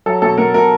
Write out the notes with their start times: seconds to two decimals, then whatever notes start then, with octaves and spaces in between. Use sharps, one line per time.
0.06 F#3 A4
0.22 B2 A4
0.38 B2 A#4
0.54 B2 A#4